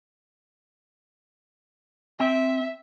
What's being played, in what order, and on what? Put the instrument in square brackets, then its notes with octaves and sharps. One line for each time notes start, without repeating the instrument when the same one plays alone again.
[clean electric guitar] C4 G5 [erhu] E5